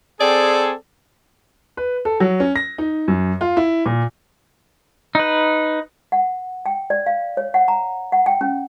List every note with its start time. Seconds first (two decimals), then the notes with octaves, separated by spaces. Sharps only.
0.21 C4 G#4 A4 D5
1.77 B4
2.05 A4
2.20 F#3
2.40 C#4
2.56 A#6
2.78 D#4
3.08 F#2
3.41 F4
3.57 E4
3.86 A#2
5.15 D#4 B4
6.12 F#5
6.66 G5
6.90 D5
7.06 F5
7.37 C#5
7.54 F#5
7.68 A#5
8.12 F#5
8.26 G5
8.41 C#4